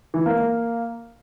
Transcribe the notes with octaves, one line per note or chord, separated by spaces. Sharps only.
E3
A#3
A#3